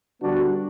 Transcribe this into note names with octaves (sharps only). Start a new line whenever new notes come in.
D3 G3 B3 D4 F#4